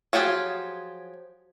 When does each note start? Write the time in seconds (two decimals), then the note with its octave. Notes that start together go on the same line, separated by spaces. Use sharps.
0.13 F3 F#3 F4 G4 G#4